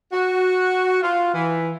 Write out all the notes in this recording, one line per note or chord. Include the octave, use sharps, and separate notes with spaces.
F#4
F4
E3